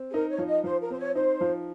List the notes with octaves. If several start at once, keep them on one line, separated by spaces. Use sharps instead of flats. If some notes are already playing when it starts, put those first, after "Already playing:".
Already playing: C4
G#4
D#4 A#4
C#5
F3
D#5
F3 C5
A#4
C4 C5
C#5
D#4 C5
F3